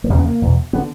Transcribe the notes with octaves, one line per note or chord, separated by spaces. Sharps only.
A#3
E2 C#3 G3
B3
A#3
E2 B2
D3 B3